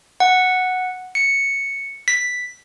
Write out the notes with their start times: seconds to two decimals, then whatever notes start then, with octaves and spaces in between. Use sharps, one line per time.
0.20 F#5
1.15 C#7
2.08 B6